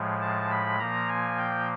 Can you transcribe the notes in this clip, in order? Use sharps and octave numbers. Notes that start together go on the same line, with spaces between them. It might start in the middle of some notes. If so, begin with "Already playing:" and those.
Already playing: A2 F3 G#3
A5
B5
A#2 F3 A#3 A#5
G#5
G5